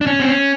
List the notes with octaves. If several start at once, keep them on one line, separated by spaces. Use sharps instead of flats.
D4
C#4
C4
C#4